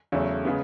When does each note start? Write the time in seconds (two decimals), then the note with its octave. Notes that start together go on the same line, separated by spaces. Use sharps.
0.12 E2 C#3 F#3 A3
0.45 C#3 G#3 B3